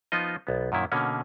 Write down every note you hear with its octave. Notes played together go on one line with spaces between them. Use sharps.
F3 B3 D#4 F4 D#5
B1 B3
F#2 A#2 D#3 E4
B2 D3 A#3 C#4